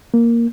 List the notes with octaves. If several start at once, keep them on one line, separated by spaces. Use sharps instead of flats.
A#3